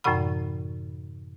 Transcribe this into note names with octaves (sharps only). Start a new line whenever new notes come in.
F#2 A2 C3 E3 F#5 B5